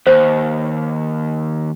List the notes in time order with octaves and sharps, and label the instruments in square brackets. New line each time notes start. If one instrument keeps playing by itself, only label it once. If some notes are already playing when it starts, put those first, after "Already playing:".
[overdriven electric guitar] D#2 [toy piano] C5